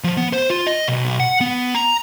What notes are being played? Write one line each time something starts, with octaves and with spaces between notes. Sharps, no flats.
F3
B3
C5
F4
D#5
B1
F#5
B3
A#5